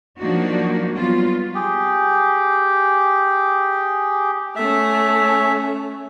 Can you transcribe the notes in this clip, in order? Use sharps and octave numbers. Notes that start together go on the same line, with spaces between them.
F3 F#3 A#3 D4 D#4 F#4
F#3 G3 B3 F4
G4 G#4 G5
A3 C#4 E5